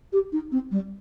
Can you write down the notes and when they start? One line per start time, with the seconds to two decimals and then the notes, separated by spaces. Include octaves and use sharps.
0.12 G4
0.32 D#4
0.52 C4
0.71 G3